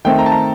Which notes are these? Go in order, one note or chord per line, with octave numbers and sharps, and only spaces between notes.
D#3 A3 C4 G5
A#5
A5
A#5